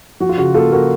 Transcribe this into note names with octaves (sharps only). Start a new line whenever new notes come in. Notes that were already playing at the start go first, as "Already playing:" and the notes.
F3 F#4
F4
C#3 F#4
A#3 F4 A4
A#3 F#4 A#4